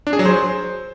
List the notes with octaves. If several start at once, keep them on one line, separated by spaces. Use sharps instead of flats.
D4
G#4
F#3
C5